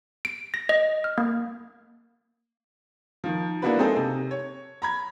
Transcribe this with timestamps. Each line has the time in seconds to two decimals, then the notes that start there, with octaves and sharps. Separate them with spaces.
0.25 D7
0.54 A#6
0.69 D#5
1.04 F6
1.18 A#3
3.24 D#3 F3
3.62 A#3 B3 D4 E4 F#4 B4
3.78 G#3 A#3 C4 D#4 G#4 A4
3.96 C3
4.31 C#5
4.82 A#5 B5 G#6